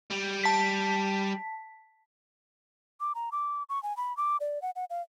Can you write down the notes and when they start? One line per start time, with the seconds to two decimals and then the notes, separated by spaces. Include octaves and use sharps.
0.10 G3
0.44 A5 B6
3.00 D6
3.15 A#5
3.32 D6
3.69 C#6
3.83 G#5
3.97 B5
4.17 D6
4.40 D5
4.62 F#5
4.76 F#5
4.90 F5